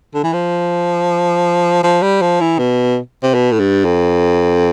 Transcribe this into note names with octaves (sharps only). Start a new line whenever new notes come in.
D3
E3
F3
F3
G3
F3
E3
B2
C3
B2
A2
G2
F2